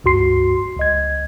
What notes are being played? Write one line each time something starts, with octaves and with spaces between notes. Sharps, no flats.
C#2 G2 F#4 C6 C7
C#2 D#5 G#6